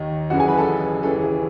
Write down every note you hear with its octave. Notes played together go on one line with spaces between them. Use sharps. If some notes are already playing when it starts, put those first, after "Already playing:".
Already playing: D#2 D#3 D#5
F#1 F#2 C#3 E3 F#4 F#5
G#4 G#5
B4 B5
A4 A5
D#2 C#3 E3 A4
G#4